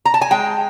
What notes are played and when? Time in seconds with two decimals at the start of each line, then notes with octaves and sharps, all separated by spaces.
0.05 A#5
0.14 A5
0.21 G#5
0.31 G#3 G5